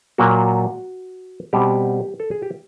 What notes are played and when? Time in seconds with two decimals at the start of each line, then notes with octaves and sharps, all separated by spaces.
0.18 A#2 F#3 A#3 F#4
1.53 B2 G3 C4 G4
2.20 A4
2.31 G#4
2.42 G4